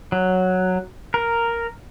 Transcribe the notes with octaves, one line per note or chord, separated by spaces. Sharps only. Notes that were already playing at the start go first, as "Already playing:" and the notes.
F#3
A#4